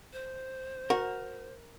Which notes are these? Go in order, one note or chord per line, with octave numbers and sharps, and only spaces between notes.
C5
F#4 A#4